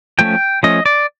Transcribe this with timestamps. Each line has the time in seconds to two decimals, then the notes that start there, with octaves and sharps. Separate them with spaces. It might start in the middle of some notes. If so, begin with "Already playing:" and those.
0.19 F3 A3 C#4 G5
0.63 F3 A3 C#4 D#5
0.86 D5